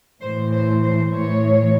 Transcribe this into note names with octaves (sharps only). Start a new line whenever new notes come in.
A2 E3 C5
C5
C5
A2 E3 C#5